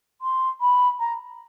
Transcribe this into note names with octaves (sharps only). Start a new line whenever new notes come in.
C6
B5
A#5